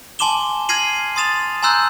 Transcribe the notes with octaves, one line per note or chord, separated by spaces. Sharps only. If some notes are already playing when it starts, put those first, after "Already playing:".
G#5 A5 C6 D6 E7 G7
F6 G#6 A#6 C7 D#7 F#7
C6 D#6 A6 E7 F7
G#5 A#5 C6 E6 F#6 G6